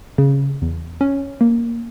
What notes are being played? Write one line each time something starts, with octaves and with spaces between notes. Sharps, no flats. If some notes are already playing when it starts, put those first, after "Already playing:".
C#3
E2
C#4
A#3